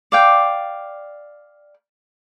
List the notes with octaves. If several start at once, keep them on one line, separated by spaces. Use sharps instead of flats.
D5 F5 G5